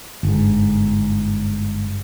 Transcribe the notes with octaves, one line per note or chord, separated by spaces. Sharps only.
G1 G#2